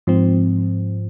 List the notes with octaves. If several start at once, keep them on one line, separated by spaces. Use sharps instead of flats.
G#2 F3 C4